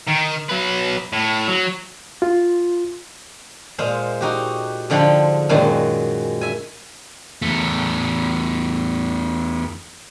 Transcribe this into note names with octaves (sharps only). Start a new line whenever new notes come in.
D#3
F#3 B4
A2
F#3
F4
A#2 G#3 C5 F5
D#4 F#4 G4
G#2 D3 F3 G5 B5 C6
F#2 A#2 D#3 F#3 G#3
E5 G#5
E2 A3